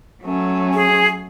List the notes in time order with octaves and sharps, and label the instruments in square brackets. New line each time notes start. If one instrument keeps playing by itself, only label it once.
[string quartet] F#3 A3 C#4
[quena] G#4